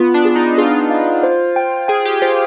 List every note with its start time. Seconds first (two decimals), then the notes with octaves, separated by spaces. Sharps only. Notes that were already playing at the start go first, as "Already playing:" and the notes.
Already playing: B3 F4
0.14 D4
0.25 G#4
0.36 D#4
0.58 F4 G#4
0.90 F5
1.23 C5
1.56 G5
1.88 G#4 G5
2.05 G4
2.22 F4 C5